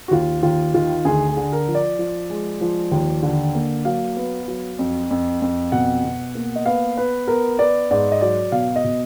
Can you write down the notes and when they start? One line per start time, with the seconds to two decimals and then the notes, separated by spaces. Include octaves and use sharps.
0.08 F#4
0.11 D#2 F4
0.43 D#2 F4
0.74 D#3 F4
1.05 D2 G#4
1.29 G#4
1.37 D3
1.53 A#4
1.68 F3
1.75 D5
1.99 F3
2.30 G#3
2.61 F3
2.91 D#2
3.23 D3
3.55 A#3
3.85 F#3 F5
4.17 B3
4.48 F#3
4.79 F2
5.11 F2
5.42 F2
5.72 B2 F#5
6.04 B2
6.35 A#3
6.56 D#5
6.66 B3 F5
6.97 B3 B4
7.28 B3 A#4
7.59 B3 D5
7.91 G#2 D5
8.12 D#5
8.21 F#3 D5
8.52 B2 F5
8.76 D#5
8.84 B2